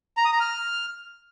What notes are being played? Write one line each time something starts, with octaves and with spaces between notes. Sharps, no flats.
A#5
D#6
A#5
F6